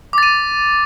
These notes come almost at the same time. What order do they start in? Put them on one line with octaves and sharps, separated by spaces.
D6 A6 D#7